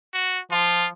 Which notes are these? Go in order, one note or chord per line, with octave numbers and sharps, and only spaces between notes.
F#4
F3 F4